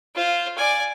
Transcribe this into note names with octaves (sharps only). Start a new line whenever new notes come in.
F4 C5
D5 G#5